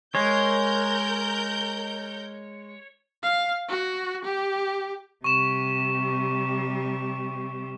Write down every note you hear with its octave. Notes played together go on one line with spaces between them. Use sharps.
G#3 A#4 C#5 G6
F5
F#4
G4
C3 G3 C#6 E7